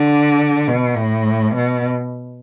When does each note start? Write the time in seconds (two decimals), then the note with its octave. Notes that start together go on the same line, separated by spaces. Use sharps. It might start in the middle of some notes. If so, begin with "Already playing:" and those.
Already playing: D3
0.68 B2
0.96 A2
1.55 B2